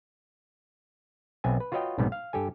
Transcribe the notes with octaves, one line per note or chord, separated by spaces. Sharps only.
B1 B3 C4 E5 G#5
B4
F4 F#4 B4 C#5 D#5 G5
B1 G#2 C3 G3 B3
F5
G2 G4 A4 G#5